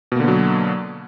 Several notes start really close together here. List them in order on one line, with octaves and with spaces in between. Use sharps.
B2 A#3 D3 B3 F#3